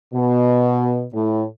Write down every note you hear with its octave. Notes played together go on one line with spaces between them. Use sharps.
B2
A2